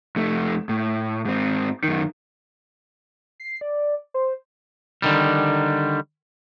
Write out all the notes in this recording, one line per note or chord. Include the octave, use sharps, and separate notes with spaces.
F2 A3
A2
G#2 C4
F#2 D#3
C7
D5
C5
D3 D#3 G3